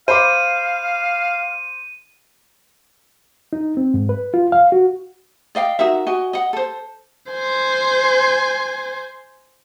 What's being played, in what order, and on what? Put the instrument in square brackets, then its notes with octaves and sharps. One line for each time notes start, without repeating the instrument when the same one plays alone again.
[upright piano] C5 B5 D6 [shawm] F5 [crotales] D#7
[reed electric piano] D#4
C4
G#2
B4
F4
F5
F#4
[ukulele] D5 D#5 F5 G5
D#4 F#4 A#4 E5
F#4 D#5 G#5
D#5 F#5
A4 C5
[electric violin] C5 G#5